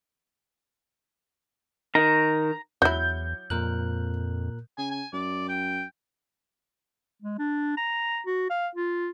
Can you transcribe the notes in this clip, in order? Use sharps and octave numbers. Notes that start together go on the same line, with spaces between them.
D#3 A#5
E2 F#3 E4 G6
F2 A#2 A#4 F#6
C#3 G#5
G#5
F#2 D5
G5
G#3
D4
A#5
F#4
F5
F4